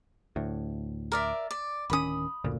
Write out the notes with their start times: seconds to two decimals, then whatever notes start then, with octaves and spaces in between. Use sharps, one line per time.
0.36 D2 A2
1.12 A#4 D5 E5
1.51 D5
1.90 D1 D#3 C#4 B5 D#6
2.44 F#1 D2 A#2